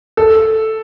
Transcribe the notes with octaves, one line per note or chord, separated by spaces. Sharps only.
A4